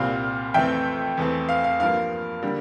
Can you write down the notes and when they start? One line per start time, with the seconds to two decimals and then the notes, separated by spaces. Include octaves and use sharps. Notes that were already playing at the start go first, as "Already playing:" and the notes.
Already playing: C2 A#2 G3 C4 F5
0.54 F2 E3 A3 C4 E5 G5
1.17 E2 E3 A3 C4
1.49 F5
1.64 F5
1.80 G2 F3 A#3 F5
2.42 D3 G3 A#3